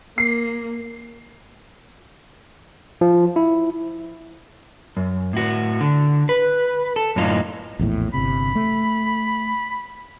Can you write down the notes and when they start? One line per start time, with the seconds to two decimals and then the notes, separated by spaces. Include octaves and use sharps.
0.18 A#3 C7
3.01 F3
3.36 E4
4.97 F#2
5.33 A2 F#4
5.81 D3
6.29 B4
6.96 A4
7.16 F#2 A2 D#4 F4
7.79 A#1 E2 A2
8.14 G1 C3 B5
8.55 A3